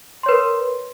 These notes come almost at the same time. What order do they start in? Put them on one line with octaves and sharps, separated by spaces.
C6 C#5 B4 A#4